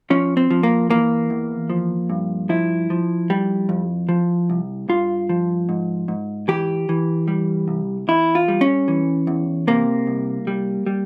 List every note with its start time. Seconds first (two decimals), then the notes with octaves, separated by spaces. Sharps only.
0.10 F3 C#4
0.37 C4
0.51 F3
0.63 A#3
0.90 E3 A#3
1.30 E2
1.70 F3
2.10 G2
2.49 F3 E4
2.90 F3
3.30 G3
3.69 F2
4.09 F3
4.50 C2
4.89 G2 F4
5.29 F3
5.69 G#2
6.08 G#2
6.48 E3 G4
6.89 E3
7.28 G3
7.68 C2
8.08 E2 E4
8.35 F4
8.48 G3
8.61 C#4
8.88 E3
9.27 E2
9.67 C3 A#3
10.07 C2
10.47 G3
10.86 G3